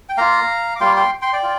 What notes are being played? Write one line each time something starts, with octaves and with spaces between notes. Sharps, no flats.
G5
A#3 F4 F5 A#5
D6
G3 A#3 F4 G5 C6
G5 C6
G5 C6
D5 G5
F4